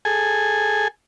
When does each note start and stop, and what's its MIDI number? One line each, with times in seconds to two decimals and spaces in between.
0.05 0.88 68
0.05 0.88 69
0.05 0.88 80